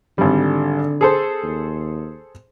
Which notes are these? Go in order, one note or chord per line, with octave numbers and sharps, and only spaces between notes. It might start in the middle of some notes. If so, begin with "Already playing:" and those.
G#1 D3 G3
G#4 A4 C5
D#2